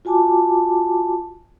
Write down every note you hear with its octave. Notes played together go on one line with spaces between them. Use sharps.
F4 F#4 G#5 A5 D6